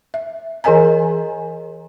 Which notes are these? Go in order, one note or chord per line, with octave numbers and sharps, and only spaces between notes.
E5
E3 G#4 A#4 D#5 G#5 A#5